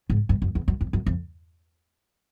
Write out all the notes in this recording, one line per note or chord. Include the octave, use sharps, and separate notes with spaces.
G#2
G2
F#2
E2
F#2
F2
F#2
F2